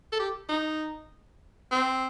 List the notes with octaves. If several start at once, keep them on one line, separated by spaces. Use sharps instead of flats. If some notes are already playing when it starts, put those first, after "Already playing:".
A4
G4
D#4
C4